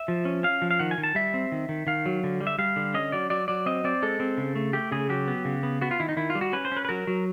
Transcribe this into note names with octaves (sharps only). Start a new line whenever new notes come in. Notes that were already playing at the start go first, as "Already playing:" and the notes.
Already playing: E5
F3
C#4
C#4 F5
F3
F5
D#3 F#5
G#5
D#3
A5
G3 E5
C4
D#3
D#3
D#3 F5
F#3
D3
G3
E5
G3 F5
D3
C#4 D#5
F#3 D5
F#3 D5
F#3 D5
C4 D#5
C4 D5
G#3 A4
C4
C#3
A3
A3 G4
C#3 G#4
F#3 G4
B3
C#3
B3
B3 F#4
F4
D#3 E4
D#4
D#3 E4
F4
G3
F#4
C#4 B4
C5
C#4 B4
B4
F#3 A#4
F#3